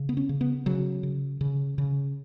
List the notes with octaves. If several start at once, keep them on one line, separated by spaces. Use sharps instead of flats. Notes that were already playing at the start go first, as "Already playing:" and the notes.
Already playing: C#3
B3
C#4
C#3
B3
C#3 F#3
C#3
C#3
C#3